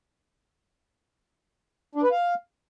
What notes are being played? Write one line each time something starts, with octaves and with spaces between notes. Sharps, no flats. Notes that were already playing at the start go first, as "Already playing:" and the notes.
D4
B4
F5